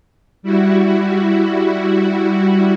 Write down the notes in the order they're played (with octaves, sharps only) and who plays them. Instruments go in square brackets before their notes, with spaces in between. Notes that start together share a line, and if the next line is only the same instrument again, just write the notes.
[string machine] G3 E4 F#4